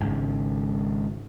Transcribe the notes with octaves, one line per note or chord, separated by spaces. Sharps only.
G#1 G#2 C#3